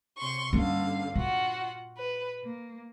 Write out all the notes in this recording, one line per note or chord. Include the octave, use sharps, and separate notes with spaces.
C3 C6 C#6
G2 D3 A#3 C#4 F5
A#2 F4 F#4 F#5
B4
A#3